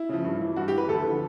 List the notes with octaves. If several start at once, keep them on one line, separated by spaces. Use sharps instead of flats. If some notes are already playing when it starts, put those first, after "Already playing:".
Already playing: E4
C#3 F3
G2
E3
G2 F#4
G4
E3 B4
D2 A4
D3 F3